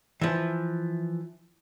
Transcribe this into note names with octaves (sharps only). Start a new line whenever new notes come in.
E3 F3